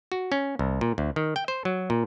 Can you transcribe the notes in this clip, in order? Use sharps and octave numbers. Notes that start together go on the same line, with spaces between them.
F#4
C#4
C2
A#2
D2
D#3
G5
C5
F#3
A#2